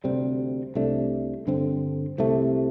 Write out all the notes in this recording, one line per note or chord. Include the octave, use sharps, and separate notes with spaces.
D2 C3 G3 C4
C2 C3 A3 D4
G2 D3 C4
C2 C3 A3